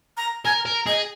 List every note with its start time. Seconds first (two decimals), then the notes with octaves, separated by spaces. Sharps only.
0.17 A#5
0.45 A#4 G#5
0.66 A#4
0.87 G#4 D#5